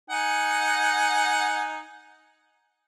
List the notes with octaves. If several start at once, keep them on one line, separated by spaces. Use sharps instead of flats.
D#4 F#5 G#5